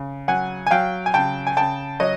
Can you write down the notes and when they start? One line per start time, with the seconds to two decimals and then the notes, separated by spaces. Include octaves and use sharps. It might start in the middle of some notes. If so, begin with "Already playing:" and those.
Already playing: C#3
0.28 F#3 F#5 G#5
0.66 G#5
0.71 F#3 F5 G5
1.06 G#5
1.14 C#3 G5 A5
1.47 G#5
1.57 C#3 G5 A5
2.00 F#3 C#5 D#5